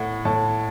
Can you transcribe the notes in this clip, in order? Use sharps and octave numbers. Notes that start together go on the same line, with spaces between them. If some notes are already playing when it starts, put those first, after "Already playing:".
Already playing: A2 F#5
A2 A5